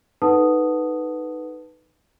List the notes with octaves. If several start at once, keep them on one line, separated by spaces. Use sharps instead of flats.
D#4 A4 B4 F#5 A5 D#6